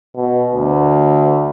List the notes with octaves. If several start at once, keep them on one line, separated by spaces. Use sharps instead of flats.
B2
D2